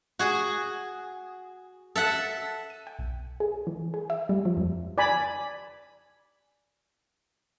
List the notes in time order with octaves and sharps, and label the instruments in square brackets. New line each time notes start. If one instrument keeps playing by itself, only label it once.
[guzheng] F#4 G#4
A4 E5 F#5 A5
[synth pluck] D#7
G5
B1
G#4
E3
G#4
E5
G3
F3
F2
[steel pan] D5 G#5 B5